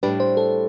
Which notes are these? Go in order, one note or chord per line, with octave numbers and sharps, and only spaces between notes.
A2 G3 D4 G4 B4
C5
A4